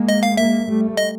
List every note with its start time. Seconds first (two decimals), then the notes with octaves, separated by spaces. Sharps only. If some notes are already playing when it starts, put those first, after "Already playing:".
Already playing: G#3 A#3
0.09 D#5
0.23 F5
0.37 G#3 A#3 E5
0.67 G3 A3
0.97 D#5